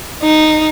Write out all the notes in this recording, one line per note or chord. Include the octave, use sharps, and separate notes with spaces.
D#4